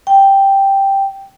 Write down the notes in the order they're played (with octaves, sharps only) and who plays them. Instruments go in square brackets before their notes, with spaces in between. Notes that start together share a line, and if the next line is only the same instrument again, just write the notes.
[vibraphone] G5